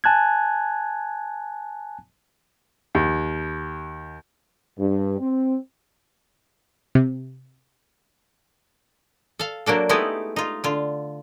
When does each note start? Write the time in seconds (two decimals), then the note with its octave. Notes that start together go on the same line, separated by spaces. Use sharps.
0.04 G#5 A5 F#6 G#6
2.95 D#2
4.79 G2
5.20 C4
6.95 C3
9.39 A4 F5
9.66 F#3 A#3 D4 A4
9.89 G#3 A3 B3 D#4 E4 G4
10.36 D#4 F4
10.64 D3 F4